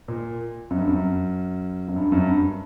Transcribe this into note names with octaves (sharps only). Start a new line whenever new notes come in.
A#2
F#2
G2
F#2
F#2
G2
F#2
G2